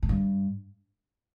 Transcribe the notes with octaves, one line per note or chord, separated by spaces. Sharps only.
G#2
G2